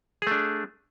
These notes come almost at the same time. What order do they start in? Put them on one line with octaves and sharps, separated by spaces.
G#4 A3 D4